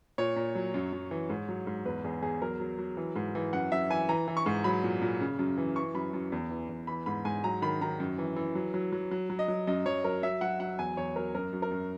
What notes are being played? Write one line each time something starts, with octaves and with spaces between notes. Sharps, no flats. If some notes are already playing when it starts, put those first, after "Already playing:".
A#2 C#5
A#2
F#3
F#2
F#2
E3
G#2
F#3
G#2
E2 B4
E2 G#4
E2 G#4
F#3 A#4
F#3
F#3
E3
G#2
E3
F#2 F#5
F#2 E5
E3 G#5
E3 A#5
E3
C#6
G#2
F#3 B5
A#2
A#2
C#3
F#2
E3
E3 C#6
F#2 B5
F#2
E2
E3
E2
E3 B5
G#2 B5
G#2 G#5
F#3 A#5
D#3 B5
D#3 A#5
F#2
E3
E3
F#3
F#3
F#3
F#3
F#3
D#5
F#3
F#2 D#5
F#2 C#5
F#3 A#4
F#3 E5
F#3 F#5
F#3 F#5
E2 G#5
E2 C#5
F#3 A#4
F#2 A#4
F#2
A#4
F#2